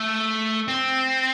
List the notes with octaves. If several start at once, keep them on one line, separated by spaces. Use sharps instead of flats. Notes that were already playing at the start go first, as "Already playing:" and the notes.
Already playing: A3
C4